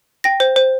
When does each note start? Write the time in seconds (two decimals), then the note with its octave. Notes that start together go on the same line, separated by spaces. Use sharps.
0.24 G5 A#6
0.40 C5
0.56 C5